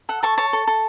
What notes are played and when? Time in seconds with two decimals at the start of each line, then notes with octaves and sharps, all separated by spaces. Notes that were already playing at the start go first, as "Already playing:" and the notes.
0.09 A4 F#5
0.23 A4 A5 C#6
0.38 C#5 A5 C#6
0.53 A4
0.67 A4